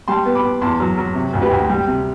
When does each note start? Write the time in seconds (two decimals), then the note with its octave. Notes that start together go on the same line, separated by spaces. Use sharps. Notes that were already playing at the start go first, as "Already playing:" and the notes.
0.08 G3 A5 C6
0.25 B3
0.35 B5 D6
0.44 B3
0.61 E2 A5 C6
0.80 F#3
0.98 F#3
1.15 C3
1.33 D2
1.42 G4 B4
1.51 D2
1.69 G3
1.87 C3